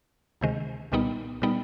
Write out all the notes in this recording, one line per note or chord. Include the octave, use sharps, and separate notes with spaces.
D2 C3 D#3 G#3
C2 A#2 G3 B3 D#4
A#2 G3 B3 D#4